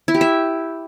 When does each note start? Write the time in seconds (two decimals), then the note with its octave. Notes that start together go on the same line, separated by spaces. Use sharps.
0.08 E4
0.14 G4
0.21 E5